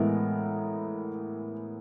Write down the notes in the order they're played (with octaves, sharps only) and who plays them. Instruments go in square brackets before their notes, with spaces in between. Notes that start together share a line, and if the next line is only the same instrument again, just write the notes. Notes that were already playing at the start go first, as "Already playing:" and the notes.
Already playing: [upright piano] A2 E3 G#3 B3 A#4